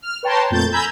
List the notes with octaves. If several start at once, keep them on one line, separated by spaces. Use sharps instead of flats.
F6
B4 C#5 G5 A5 A#5 C6
F2 A#2 A3 G6 A6
G#5 A#5 B5 E6 G6 G#6